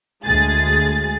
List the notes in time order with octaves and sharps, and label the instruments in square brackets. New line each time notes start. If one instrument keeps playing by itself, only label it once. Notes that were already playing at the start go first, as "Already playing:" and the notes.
[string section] D2 G#3 G#4 A6